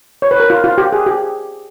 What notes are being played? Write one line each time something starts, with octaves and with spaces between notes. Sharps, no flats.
C#5
B4
A#4
F4
F4
G4
G#4
G4